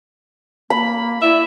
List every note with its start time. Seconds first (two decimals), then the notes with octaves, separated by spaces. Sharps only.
0.70 A#3 B5
1.22 E4 D5 E5